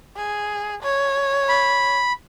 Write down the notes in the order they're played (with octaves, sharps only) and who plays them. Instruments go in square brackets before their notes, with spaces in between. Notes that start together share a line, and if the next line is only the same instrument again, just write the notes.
[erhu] G#4
C#5
[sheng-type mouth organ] B5